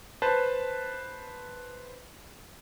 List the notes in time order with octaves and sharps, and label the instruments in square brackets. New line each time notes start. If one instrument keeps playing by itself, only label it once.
[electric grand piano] B4 C5 A5